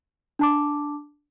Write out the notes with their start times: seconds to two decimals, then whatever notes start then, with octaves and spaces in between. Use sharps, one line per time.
0.39 D4 A5 D6